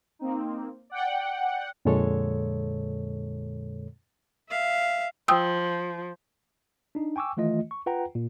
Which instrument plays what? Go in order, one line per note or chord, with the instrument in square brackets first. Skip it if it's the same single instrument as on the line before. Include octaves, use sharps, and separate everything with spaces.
[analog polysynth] A#3 C4 D#4
D5 F#5 G5
[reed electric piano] F2 A#2 D3 G#3 A4 C#5
[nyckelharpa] E5 F5
[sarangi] F3 [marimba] G5 D#6 E6
[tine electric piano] D4 D#4
G5 G#5 C#6 D6 E6
D#3 E3 A3 F4 D#5
C#6
F4 B4 F#5 G5 A#5
A#2